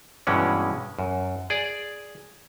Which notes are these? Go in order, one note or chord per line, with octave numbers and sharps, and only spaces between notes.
G2 B2 E3 G#3 C#4
F#2
G#4 D5